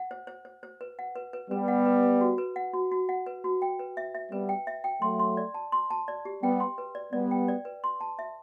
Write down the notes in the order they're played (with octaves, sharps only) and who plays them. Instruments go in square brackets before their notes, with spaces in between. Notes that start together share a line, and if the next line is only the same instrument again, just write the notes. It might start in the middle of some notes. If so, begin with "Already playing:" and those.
Already playing: [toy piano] F#5
C5
C5
C5
C5
B4
F#5
B4
B4
[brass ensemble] G3 B3 [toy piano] B4
[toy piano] F#5
B4
B4
F#4
B4
F#5
F#4
F#4
F#5
B4
F#4
G5
B4
E5
E5
[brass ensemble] G3 B3 [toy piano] B4
[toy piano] G5
E5
G5
[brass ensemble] F#3 A3 [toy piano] C6
[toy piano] C6
D5
A5
C6
A5
D5
G4
[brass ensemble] G3 B3 [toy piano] G5
[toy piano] C6
B4
D5
[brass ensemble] G3 B3 [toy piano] D5
[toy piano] G5
D5
B4
C6
A5
E5